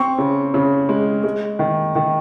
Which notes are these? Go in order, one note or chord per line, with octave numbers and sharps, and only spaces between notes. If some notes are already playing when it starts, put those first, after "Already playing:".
Already playing: C4 C#6
C#3
C#3
G#3
G#3
D#3
D#3